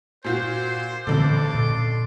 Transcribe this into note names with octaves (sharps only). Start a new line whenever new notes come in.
A#2 F4 F#4 C5
A1 A#2 D3 C4 D4 A4 C6 D6
A#2